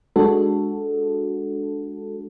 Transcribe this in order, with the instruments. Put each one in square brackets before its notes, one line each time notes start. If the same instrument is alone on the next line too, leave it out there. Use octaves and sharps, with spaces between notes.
[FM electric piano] G#3 D4 F#4 A4